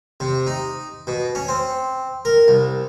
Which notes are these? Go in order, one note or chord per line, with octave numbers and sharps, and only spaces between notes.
C3
D#4
B2
C#4
C4
A#4
C2